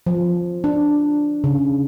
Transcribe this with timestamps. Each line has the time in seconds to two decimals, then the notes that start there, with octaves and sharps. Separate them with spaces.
0.06 F3
0.64 D4
1.44 C#3